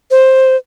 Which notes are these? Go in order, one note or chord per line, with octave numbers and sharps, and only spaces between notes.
C5